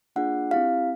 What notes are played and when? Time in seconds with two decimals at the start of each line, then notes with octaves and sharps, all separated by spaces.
0.16 A#3 D4 F4 G#4 F#5
0.51 C4 E4 G4 F5